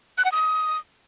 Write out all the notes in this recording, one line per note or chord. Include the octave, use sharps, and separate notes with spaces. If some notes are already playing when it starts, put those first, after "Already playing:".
F#6
F#5
D#6